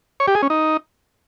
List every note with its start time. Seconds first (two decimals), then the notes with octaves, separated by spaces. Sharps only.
0.20 C#5
0.27 G4
0.35 G#4
0.42 C#4
0.50 D#4